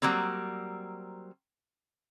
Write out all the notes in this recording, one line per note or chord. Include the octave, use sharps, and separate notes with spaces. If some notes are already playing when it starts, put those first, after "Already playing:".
F#3 G3 A#3 C4